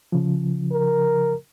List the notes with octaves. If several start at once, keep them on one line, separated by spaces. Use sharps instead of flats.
C#3 F3
A#4